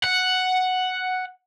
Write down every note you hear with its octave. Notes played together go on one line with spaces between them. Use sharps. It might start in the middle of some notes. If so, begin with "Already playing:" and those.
F#5